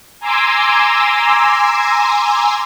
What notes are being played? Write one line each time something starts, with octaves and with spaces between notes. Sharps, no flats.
G#5 A#5 C6 D6 E6